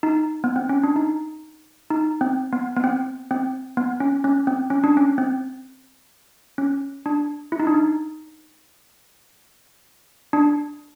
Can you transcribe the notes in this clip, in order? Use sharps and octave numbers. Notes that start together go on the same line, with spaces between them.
D#4
B3
C4
C#4
D4
D#4
D#4
C4
B3
B3
C4
C4
B3
C#4
C#4
C4
C#4
D4
C#4
C4
C#4
D4
E4
D#4
D4
D#4
D4